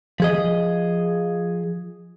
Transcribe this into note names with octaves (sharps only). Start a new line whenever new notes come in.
F3 G#4 D#5